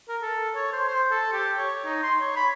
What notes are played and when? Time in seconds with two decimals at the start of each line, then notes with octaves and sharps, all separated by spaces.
0.08 A#4
0.22 A4
0.55 C#5
0.73 C5
0.88 C5
1.10 A4
1.32 G4
1.58 C#5
1.85 D#4
2.03 C6
2.21 C#5
2.36 B5